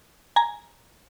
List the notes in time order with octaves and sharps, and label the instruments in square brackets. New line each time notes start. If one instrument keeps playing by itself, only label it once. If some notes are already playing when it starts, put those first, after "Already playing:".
[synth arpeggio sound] G#5 A#5